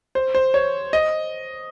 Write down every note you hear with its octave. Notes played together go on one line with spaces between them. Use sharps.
C5
C5
C#5
D#5